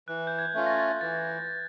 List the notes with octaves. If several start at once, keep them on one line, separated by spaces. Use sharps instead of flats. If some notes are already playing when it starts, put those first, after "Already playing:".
E3 F#6
G6
G#6
A3 C#4 F4
A#6
A6
E3 A6